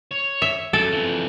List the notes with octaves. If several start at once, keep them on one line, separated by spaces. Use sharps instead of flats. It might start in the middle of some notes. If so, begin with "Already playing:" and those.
C#5
E5
F#2 A4
F2 E3